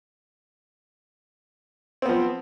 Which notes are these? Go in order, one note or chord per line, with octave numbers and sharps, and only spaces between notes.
F3 B3 C4